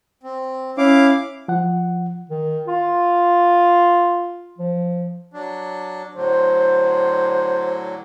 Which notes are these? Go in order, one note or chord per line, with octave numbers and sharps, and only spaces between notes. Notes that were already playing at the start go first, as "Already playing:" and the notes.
C4
C#4 E4 F5 D6
F3 F#5
D#3
F4
F3
F#3 D4
A2 D3 F#3 C5